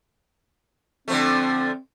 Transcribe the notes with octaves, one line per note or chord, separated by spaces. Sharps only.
D3 F3 A3 C4